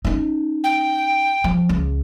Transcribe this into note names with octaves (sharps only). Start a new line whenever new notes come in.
C#4 D#4
G5
F3
C#2